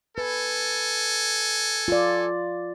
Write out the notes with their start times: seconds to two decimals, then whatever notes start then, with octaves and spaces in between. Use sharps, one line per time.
0.18 A4 B4 G#5
1.88 F4 D5